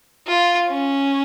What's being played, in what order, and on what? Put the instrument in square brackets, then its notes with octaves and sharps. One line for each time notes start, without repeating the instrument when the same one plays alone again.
[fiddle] F4
C#4